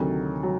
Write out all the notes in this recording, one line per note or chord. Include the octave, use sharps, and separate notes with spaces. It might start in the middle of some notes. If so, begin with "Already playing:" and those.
Already playing: D2 C3 D#3 F#3
F#3